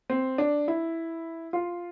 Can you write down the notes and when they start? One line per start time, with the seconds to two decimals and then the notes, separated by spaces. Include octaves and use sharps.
0.10 C4
0.38 D4
0.68 E4
1.53 F4